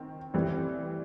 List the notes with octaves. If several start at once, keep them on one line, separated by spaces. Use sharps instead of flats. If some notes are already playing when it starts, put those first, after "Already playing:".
Already playing: D#3 C4
A2 E3 G3 C4